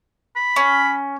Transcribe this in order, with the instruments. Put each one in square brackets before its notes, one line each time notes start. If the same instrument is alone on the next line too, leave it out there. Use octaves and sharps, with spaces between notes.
[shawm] B5
[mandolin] C#4